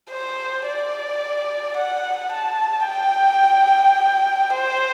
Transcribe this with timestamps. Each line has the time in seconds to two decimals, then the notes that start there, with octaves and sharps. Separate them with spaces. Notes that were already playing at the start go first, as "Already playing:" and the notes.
0.11 C5
0.67 D5
1.77 F#5
2.32 A5
2.87 G5
4.53 C5